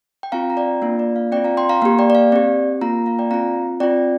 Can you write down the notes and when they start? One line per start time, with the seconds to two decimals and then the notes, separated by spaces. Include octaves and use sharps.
0.23 G5
0.32 C4 F4 F5 A#5
0.50 A#5
0.57 D5 G5
0.82 A#3 D4 F4 F5
0.99 D5
1.16 F5
1.32 C4 D5 G5
1.37 F4
1.44 F5 A#5
1.57 G5 C6
1.69 F5 A#5
1.82 A#3 F5
1.85 G4
1.99 D5 G5
2.10 D5
2.15 F5
2.32 C4 G4 D5
2.81 A#3 F4 F5 A#5
3.06 F5 A#5
3.19 D5 G5
3.31 C4 F4 F5 A#5
3.80 C4 F4 D5 G5